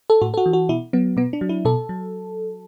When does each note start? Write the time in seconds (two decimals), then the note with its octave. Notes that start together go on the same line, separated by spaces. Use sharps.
0.10 A4
0.21 A2 F#4
0.34 A4
0.37 F#4
0.46 E3
0.53 F#4
0.69 B2 E4
0.93 F#3 B3
1.17 B2 B3
1.33 D4
1.41 F#3
1.49 E4
1.65 B2 A4
1.89 F#3